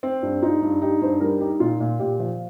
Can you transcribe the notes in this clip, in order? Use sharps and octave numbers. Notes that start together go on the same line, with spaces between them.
C4
G2
D#4 F4
G2
D#4 G4
G2 C5
G3 A#4
D#4 G4
A#2 F4
A#2
A#2 G4
F3